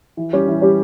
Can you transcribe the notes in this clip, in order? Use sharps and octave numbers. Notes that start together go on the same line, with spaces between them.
E3
G3 C#4 G4
E3
G3 C#4 G4